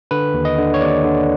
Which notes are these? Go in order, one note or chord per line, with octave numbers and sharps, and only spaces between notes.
D3 B4
D#2
D#5
D3
C#5
D#2 D5
D3